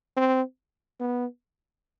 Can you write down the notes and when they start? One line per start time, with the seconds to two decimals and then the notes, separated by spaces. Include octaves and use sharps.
0.17 C4
1.00 B3